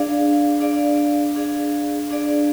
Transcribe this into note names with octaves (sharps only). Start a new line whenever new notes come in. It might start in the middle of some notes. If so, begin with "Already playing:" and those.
Already playing: D4 G#4 D5 F5
D4 G#4 D5 F5
D4 G#4 D5 F5
D4 G#4 D5 F5